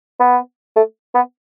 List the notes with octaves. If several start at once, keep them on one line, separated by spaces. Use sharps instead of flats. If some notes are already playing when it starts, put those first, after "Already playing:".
B3
A3
B3